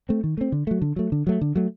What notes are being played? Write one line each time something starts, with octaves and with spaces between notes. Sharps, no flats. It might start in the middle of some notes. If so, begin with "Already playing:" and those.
A3 C4
D#3
A3 C4
D3
F#3 A3
D3
F#3 A3
D3
F#3 A3
D3
F#3 A3